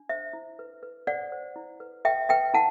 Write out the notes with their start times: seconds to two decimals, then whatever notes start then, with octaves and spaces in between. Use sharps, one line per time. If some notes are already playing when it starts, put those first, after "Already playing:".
Already playing: D4
0.09 C5 E5
0.33 E4
0.59 B4
0.83 B4
1.07 C5 D5 F#5
1.32 C5
1.56 E4
1.80 B4
2.05 B4 E5 G5
2.29 B4 E5 G5
2.54 E4 F#5 A5